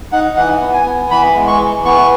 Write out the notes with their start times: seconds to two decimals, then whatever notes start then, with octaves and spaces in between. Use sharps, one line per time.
0.12 D#4 F#5
0.37 E3 F#5
0.61 B3
0.73 G#5
0.86 B3
1.11 E3 B5
1.35 G#3
1.48 C#6
1.60 E3
1.85 B3 C#6